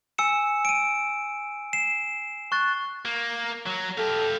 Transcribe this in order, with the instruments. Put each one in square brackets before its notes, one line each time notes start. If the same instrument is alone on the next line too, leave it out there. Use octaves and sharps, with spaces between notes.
[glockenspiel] G#5 E6 C#7 E7
D7 D#7
C7 E7
C#6 F#6 A6
[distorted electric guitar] A#3
F#3
[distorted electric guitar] G4 F5 [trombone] A4